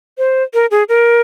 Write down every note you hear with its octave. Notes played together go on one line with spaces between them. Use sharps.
C5
A#4
G#4
A#4